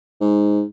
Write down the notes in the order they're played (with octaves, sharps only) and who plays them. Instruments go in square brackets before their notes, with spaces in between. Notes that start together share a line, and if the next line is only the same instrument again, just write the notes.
[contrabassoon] G#2